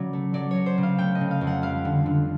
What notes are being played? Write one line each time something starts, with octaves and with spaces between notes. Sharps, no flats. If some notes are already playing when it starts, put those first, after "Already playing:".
Already playing: C#3 F#3 D5
A3
F#3 D5
F#3 C#5
C5
C#3
F5
A3 G5
D#5
C#3
F5
F2
F#5
G3 F5
D3
D3